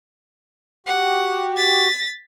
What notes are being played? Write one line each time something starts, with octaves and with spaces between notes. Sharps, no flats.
F#4 G4 F#5
A6 B6